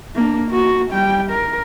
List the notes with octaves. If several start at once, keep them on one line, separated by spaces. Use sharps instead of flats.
A#3 D4
A#3 F#4
G3 G5
A#4